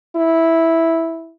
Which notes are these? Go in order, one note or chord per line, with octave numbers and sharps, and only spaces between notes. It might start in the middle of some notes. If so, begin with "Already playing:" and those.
E4